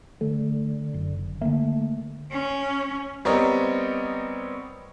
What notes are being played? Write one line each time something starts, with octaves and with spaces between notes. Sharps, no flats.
D3 A3
F#1
D3 A3 A#3
C#4
G3 B3 C4 A#4 C#5 D#5